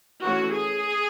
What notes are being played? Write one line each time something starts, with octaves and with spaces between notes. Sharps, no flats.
E3 A3 C#4 F#4
G#4